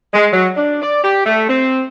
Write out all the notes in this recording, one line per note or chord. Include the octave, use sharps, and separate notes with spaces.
G#3
F#3
D4
D5
G4
A3
C4